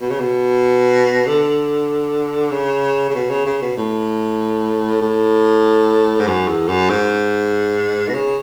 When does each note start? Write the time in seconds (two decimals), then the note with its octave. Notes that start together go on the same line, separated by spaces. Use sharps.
0.01 B2
0.10 C#3
0.19 B2
1.26 D3
2.51 C#3
3.10 C#3
3.15 B2
3.29 C#3
3.46 C#3
3.62 B2
3.77 A2
5.01 A2
6.20 G#2
6.27 F#2
6.48 E2
6.68 F#2
6.90 G#2
8.08 B2
8.14 C#3